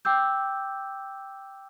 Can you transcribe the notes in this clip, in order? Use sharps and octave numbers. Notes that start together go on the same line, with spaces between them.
G5 D6 E6 G6